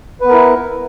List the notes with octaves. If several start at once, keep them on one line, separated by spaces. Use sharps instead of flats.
B3 E4 A#4 B4